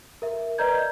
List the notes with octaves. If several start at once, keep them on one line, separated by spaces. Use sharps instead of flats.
A#4 E5
B4 D5 D#5 A#5 G6 G#6